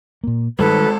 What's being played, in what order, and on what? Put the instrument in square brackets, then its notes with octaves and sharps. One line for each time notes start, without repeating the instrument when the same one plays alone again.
[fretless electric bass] A#2 A#3
[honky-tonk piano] G#1 G#2 [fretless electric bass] D#3 G3 [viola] A4 [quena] B4